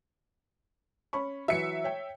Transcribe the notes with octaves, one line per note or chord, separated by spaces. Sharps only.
C#4 B5 C#6
E3 F#3 E5 C#7
C#5 G5